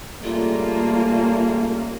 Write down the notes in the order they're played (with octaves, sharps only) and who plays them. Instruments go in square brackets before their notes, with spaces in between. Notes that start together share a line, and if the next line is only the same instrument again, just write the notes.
[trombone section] C#3 G3 A3 [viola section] A#3 [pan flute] F4